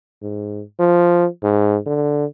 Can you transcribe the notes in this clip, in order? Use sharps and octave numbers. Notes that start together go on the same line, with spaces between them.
G#2
F3
G#2
D3